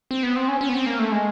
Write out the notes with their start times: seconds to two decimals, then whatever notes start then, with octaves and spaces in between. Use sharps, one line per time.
0.11 C4
0.23 B3
0.36 C4
0.48 C#4
0.61 C#4
0.69 B3
0.74 C4
0.86 A#3
0.99 A3
1.12 G#3